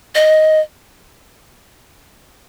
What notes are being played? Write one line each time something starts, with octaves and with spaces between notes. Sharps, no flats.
D#5